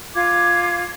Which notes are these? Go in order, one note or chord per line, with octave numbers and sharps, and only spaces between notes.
F4 D6 G#6